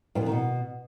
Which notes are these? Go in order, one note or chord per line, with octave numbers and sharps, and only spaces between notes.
G2
F2
D#3
B2